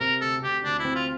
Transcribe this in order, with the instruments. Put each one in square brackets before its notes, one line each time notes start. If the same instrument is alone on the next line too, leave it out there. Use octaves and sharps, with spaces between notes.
[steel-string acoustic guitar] C3 [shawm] A#4
[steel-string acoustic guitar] D2 [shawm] A4
[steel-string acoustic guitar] C3 [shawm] G4
[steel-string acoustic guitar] D2 [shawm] D4
[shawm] E4
[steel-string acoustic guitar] C4
[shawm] F4